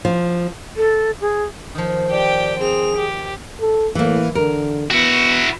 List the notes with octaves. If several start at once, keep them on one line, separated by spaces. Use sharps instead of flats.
F3
A4
G#4
D#3 F3
G4 D5 G5
C4 G#4 F7
G4
A4
A2 E3 A#3
D3 A#4
B3 E4 F#4